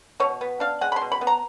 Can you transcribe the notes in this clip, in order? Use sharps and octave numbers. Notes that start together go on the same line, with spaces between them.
B2 C#5
B3
D4 F5
G#3 F#5
B5
C6
B2
B5
B3
A#5